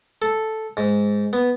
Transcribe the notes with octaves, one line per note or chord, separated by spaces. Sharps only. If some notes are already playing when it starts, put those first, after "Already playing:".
A4
G#2
B3